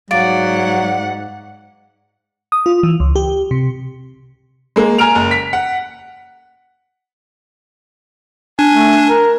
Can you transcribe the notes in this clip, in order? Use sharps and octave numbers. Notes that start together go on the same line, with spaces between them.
G#2 F#3 D5 F5 F#5 A6 D7
D#6
F4
E3
C#2
G4
C3
G#3 A#3
G#5 A#5 F6 D7 F7
F#1
B6
F#5
D4 G#5
A3
A#4